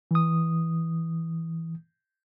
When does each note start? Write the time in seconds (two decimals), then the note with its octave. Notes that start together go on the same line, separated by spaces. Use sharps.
0.11 E3 D#6